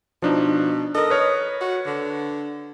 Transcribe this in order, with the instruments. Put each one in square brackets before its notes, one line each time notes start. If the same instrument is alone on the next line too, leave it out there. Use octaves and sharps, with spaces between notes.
[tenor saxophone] B2 [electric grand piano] F3 D4 D#4
[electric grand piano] A4 A#4 [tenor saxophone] D#5
[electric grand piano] B4 C#5 F6
[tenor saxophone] F#4
D3